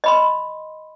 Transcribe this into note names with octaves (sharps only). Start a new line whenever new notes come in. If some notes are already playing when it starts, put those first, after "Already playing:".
D#5 B5 C6